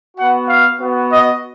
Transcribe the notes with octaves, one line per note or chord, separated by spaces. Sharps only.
B3 F#4 F#5
F5
B3 F#4
D#5